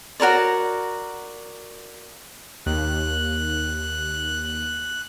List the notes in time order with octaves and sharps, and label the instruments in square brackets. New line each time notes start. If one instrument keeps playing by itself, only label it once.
[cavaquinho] F#4 A#4 C#5 D5
[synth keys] D#2 [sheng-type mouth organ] F#6